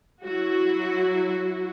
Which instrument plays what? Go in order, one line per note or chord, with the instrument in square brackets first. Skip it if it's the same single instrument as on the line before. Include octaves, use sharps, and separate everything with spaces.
[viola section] F#3 E4 F#4